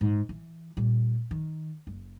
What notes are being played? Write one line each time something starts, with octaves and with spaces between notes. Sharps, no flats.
G#2
E3
A#2 G3
D#3
F#1